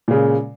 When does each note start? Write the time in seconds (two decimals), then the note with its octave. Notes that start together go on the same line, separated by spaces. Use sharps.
0.08 A#2
0.11 C#3
0.13 G#3